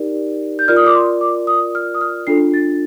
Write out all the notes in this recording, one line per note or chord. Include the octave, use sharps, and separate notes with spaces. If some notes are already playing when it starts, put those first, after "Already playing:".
Already playing: D#4 G4 A#4 D5
G6
F4 A#4 D5 F6
D#6
D6
C6
D6
D#6
F6
D#6
F6
D4 F4 A4 C7
A6